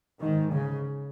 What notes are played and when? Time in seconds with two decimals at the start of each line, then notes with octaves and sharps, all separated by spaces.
0.21 G#2 D#3
0.53 C#3